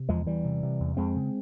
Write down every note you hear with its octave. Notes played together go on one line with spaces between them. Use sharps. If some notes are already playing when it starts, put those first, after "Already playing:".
Already playing: C3
E2 F3 G#3
E2 E3 G3
C3
C3
E2
F2 G#3 C4
C#3